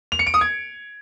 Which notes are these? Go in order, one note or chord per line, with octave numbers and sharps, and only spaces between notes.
F7
C#7
D7
D#6
G#6